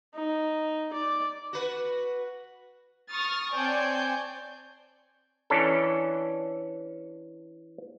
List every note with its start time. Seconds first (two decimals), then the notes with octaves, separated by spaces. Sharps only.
0.15 D#4
0.93 D5
1.53 F#4 B4
3.10 C#6 D#6 F6 A6
3.54 C4 C#5 D5 G#5 A5 G6
5.50 E3 C#4 D4 A4